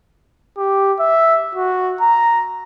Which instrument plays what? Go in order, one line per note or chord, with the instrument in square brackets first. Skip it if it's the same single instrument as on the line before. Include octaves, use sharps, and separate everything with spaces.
[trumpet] G4
E5
F#4
A#5